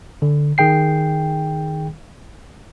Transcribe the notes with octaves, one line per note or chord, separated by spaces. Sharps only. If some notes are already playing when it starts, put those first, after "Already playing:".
D3
D#3 G#4 G5 C7